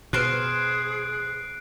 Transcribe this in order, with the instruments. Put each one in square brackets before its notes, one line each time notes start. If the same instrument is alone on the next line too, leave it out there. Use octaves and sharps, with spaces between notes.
[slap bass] B2 [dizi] G#4 [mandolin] B4 C5 F5 [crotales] F#6 C7 D7